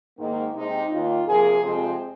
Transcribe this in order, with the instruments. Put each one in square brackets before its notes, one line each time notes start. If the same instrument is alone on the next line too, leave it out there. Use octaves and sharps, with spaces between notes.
[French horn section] G#2 D#3 A#3
C3 G#3 C4 D#4
D#2 D#3 A#3 F4
C3 F3 A#3 G#4
F2 C3 F3 G#3 C4 G#4